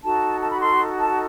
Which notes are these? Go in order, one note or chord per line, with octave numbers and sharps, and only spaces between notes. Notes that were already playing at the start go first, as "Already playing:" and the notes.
D#4 F#4 A4 A5
A5
B5
C6
A5